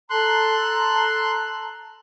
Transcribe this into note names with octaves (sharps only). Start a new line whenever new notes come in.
A4 A5 A#5 C6 F#6